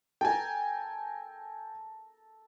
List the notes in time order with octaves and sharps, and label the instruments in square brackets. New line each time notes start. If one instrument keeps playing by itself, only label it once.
[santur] A4 A#5 [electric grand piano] G5 G#5